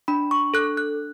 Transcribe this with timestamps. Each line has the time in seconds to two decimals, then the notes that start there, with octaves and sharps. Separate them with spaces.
0.08 D4 B5
0.31 C#6
0.54 A4 F#6
0.77 F#6